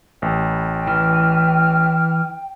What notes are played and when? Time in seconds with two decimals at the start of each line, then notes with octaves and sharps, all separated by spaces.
0.22 A1 G5
0.87 E3 F6